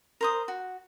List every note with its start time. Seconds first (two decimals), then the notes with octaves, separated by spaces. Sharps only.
0.21 A#4 C5 D#6
0.48 F#4